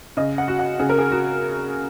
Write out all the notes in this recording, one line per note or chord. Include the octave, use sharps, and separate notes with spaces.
C#3 D#5
F#5
F#4
F#5
C#3 G#4
A#4
G#4
F#4